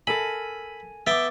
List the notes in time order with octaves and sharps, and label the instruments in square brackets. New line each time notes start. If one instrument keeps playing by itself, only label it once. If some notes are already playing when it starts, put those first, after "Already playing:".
[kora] A4 A#4 E5 [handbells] G#5 [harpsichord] B5
[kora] B3 [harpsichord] E5 G5 A5 [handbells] D6 A6